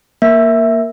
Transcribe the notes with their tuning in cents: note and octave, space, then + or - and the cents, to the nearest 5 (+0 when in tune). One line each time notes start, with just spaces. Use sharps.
A#3 +0 E5 +0